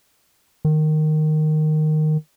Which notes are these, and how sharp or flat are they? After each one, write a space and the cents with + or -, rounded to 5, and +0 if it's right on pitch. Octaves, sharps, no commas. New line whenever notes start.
D#3 -10